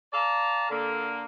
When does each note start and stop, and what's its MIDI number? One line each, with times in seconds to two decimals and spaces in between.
0.13 0.70 74
0.13 0.70 77
0.13 0.70 81
0.13 0.70 82
0.70 1.24 50
0.70 1.24 58